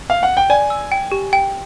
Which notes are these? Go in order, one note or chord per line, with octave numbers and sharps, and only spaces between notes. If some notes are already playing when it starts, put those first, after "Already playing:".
F5
F#5
G5
D5 G#5
E6
G5
G4
G5